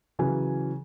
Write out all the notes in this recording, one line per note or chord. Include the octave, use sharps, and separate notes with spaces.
C#3 E3 F#3 G#5